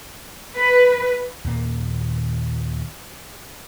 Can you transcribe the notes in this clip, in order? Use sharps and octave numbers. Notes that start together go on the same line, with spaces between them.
B4
D#2 A#2 A#3